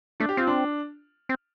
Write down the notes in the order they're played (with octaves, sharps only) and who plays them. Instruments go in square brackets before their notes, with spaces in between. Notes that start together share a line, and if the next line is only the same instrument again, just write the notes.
[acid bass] A3 [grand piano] D4
[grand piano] G4
[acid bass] C4 [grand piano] F4
[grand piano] D4
[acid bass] C4